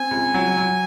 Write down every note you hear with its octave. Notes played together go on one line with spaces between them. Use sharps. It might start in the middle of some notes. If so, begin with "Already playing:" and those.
Already playing: C4 G#5
C#2
F#3
F#3